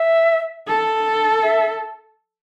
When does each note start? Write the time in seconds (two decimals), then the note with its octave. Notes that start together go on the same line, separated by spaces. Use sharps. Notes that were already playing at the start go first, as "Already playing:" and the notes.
Already playing: E5
0.68 A4
1.43 E5